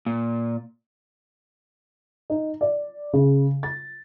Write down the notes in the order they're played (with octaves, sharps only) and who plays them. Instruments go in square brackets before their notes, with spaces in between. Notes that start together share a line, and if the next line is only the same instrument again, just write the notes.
[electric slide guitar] A#2
[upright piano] D#4
D5
C#3
A6